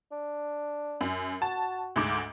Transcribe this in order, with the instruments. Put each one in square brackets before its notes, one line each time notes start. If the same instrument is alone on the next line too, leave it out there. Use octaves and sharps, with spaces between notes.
[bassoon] D4
[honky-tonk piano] F#2
[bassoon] F#4 [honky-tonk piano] A5
[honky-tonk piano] D2 G#2 D6